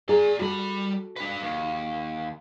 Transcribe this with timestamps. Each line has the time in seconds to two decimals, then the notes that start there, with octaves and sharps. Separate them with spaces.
0.09 G#4 D5 A#5
0.39 G3 F#4 A4 B5
1.16 D4 B4
1.42 D#2